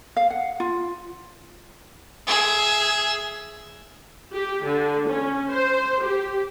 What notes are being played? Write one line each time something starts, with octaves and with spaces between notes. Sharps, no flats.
F5
F#5
F4
G#4 E5
G4
D3
C#4
C5
G4